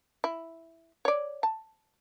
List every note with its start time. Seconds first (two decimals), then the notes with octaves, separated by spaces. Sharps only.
0.24 E4
1.05 C#5 D5
1.43 A5